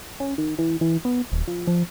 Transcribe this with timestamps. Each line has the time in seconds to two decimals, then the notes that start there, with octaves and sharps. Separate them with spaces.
0.20 C#4
0.38 D#3
0.59 E3
0.81 E3
1.05 B3
1.32 D#1
1.47 F3
1.67 F3